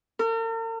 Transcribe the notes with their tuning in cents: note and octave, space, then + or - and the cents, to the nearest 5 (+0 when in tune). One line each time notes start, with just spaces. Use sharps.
A#4 -45